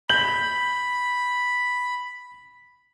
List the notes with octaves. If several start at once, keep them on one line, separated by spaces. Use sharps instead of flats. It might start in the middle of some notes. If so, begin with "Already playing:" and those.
B5 G6 F#7